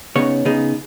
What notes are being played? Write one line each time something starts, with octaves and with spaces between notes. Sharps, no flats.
C#3 B3 D#4 C#5
C#3 B3 D#4 G#4